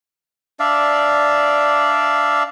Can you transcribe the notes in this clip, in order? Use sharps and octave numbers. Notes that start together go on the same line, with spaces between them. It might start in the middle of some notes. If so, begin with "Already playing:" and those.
D4 D5 E5 F5